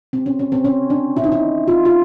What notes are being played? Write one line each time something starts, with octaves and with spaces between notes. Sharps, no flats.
C4
C#4
C#4
C4
C#4
D4
E4
D#4
E4
F4
F4